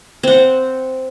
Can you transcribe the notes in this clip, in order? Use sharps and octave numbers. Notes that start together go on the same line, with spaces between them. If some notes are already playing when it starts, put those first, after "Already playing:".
C4 F#5